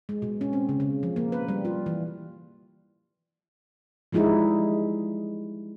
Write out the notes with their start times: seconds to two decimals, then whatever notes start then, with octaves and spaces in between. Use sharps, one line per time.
0.09 G#3
0.22 B2
0.41 C#4
0.53 C4
0.69 C#3
0.80 C#3
1.03 F3
1.16 A#3
1.32 B4
1.48 G3
1.65 F4
1.86 E3
4.12 F3 G3 G#3 D#4 E4